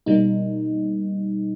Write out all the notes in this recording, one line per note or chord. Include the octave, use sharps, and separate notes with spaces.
B2 G3 A#3 D#4